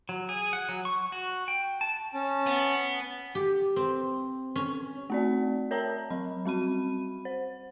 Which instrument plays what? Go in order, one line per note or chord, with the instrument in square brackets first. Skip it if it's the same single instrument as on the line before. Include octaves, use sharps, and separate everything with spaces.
[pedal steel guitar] F#3
G#4
F#5
F#3
C#6
F#4
G5
A5
[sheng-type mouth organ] C#4 A5
[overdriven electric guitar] B3
[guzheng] G4
C4
C#4
[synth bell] A3 C4 D5
A#4 C#5 A5 A#5
F#3 B5
G3 C4 B5 D#7
C5